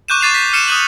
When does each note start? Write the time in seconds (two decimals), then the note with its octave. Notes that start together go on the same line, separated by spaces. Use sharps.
0.08 C#6 D6 F#6 G6 D#7 E7
0.21 C#6 D6 A6 C7 E7 F7
0.34 B6
0.53 F6 C7 C#7 D#7 E7
0.68 D#6 F#6 F#7